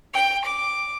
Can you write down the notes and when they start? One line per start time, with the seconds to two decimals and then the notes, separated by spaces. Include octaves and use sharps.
0.13 G5
0.45 D6